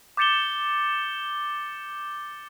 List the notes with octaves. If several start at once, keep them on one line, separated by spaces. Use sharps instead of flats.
D6 G6 A6 C#7 E7 G7